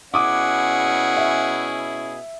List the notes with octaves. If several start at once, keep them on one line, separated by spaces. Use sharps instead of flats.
B2 C#4 E4 G#4 F#5 D6 D#6
E5